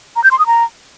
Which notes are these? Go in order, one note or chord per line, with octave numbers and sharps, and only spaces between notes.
A#5
G6
C6
D#6
A#5